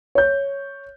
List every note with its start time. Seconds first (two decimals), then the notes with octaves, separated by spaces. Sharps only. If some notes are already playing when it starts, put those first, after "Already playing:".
0.15 C#5 G6